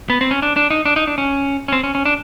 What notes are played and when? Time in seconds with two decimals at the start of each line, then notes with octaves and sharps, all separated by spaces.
0.10 B3
0.21 C4
0.31 C#4
0.42 D4
0.56 D4
0.70 D#4
0.85 D4
0.96 D#4
1.07 D4
1.18 C#4
1.68 C#4
1.72 C4
1.84 C#4
1.95 C#4
2.05 D4